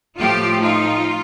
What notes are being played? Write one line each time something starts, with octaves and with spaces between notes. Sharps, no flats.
A2 F3 A3 F4 G4
D#4 F4